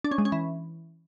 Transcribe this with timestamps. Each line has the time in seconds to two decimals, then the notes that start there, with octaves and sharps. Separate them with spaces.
0.04 D4
0.11 C#4
0.18 G#3
0.25 C#4
0.32 E3